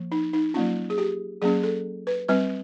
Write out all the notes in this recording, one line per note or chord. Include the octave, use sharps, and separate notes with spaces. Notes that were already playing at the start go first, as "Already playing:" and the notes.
Already playing: F3 A#3
D#4
D#4
F#3 A#3 C#4 F4
G#4
G4
F#3 A#3 C#4 G#4
A4
B4
G3 C4 B4